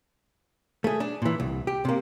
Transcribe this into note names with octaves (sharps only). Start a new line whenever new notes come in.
A3 G#4
D4
A#2 E3
C2
G4
C3 A#3